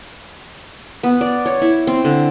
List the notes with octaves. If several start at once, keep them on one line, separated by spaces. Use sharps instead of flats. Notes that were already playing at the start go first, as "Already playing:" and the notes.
B3
D5
C#5
E4
C4
D3